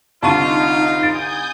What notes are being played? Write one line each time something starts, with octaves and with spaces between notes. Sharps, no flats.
C2 D3 D#4 F4 A5 C#6 D#7
G#5 D#6 G6 A6 D7